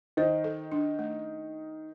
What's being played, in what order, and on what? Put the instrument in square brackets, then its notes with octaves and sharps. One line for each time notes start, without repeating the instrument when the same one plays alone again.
[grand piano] D#3 D#4 [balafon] C5
[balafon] A4
D4
A3